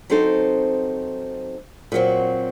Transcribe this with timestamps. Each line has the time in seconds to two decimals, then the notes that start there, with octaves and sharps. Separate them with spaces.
0.10 F#3 C4 D#4 A4 C5
1.92 A#2 F#3 C4 F#4